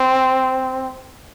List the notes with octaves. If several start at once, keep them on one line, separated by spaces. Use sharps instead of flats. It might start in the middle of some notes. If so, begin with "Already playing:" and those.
Already playing: C4